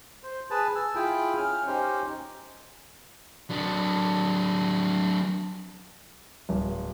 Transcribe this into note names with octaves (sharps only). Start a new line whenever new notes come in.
C5
G#4 B4 A5
G#5 E6
E4 F4 G#4 G5 B5
C#4 F6
C#4 D#4 G4 C5
F#3 D4
D1